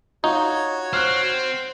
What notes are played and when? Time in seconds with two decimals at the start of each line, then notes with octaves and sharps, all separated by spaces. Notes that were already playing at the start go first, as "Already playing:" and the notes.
0.24 D#4 F4 F#4 C#5
0.93 C4 F6 F#6